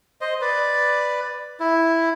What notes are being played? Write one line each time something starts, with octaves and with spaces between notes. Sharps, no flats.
C5 D#5
B4 D5
E4